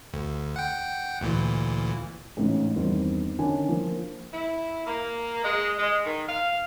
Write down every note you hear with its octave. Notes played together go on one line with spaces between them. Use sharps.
D2
F#5 G5
D2 A#2 E3
A1 G#2 C#3 D#4
E2 G2 D#3 B3 C4 D#4
D3 D#3 C#4 D4 G#5
F3 A#3
E4
A#3
G#3
G#3
D#3
F5